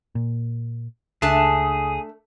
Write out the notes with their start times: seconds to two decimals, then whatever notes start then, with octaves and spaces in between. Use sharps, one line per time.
0.15 A#2
1.22 C#2 A3 D4 G#4 A5